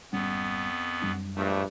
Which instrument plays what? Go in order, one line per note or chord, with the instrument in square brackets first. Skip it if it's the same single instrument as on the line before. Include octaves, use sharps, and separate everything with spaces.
[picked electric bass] G#1 G3 C#4 [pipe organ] F2 B3
[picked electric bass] F#2 G3 D4
[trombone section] A#1 G2 [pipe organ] A3